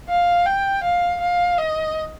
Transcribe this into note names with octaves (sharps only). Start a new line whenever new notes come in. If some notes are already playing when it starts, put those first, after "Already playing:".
F5
G5
F5
F5
D#5